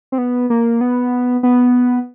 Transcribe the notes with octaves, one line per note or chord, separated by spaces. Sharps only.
C4
B3
A#3
B3
B3